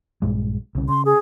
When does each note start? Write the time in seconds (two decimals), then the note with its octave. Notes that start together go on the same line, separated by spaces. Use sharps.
0.22 A#1 G2 G#3
0.75 C2 C#3
0.89 C#3 C6
1.05 G#4